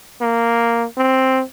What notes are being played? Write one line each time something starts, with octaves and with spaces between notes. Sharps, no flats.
A#3
C4